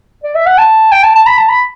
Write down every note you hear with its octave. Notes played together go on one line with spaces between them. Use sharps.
D5
E5
F#5
A5
G5
A5
A5
B5
A5
B5